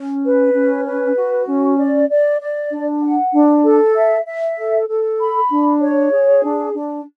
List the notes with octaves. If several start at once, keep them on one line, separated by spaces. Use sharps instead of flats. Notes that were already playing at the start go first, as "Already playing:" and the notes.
Already playing: C#4
B4
C#4
B4
F#4
C#4
D5
D5
D5
D4
F#5
D4
A4
E5
E5
A4
A4
B5
D4
C#5
G#4
D4
D4